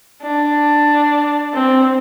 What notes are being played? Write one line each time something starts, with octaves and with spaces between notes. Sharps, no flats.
D4
C4